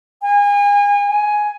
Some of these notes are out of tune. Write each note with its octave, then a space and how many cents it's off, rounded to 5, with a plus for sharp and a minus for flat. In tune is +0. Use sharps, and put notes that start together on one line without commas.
G#5 -35
G#5 +10